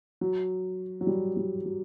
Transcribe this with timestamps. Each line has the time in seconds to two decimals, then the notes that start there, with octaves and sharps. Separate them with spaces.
0.21 F#3
1.01 F#3
1.07 G3
1.37 G3
1.65 F#3